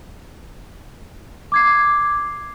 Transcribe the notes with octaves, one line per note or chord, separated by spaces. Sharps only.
D6 G#6 C7